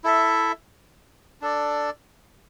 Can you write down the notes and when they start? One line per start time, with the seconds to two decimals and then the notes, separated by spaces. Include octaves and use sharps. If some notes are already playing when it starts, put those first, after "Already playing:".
0.04 E4 A4 E5
1.42 D4 A4 D5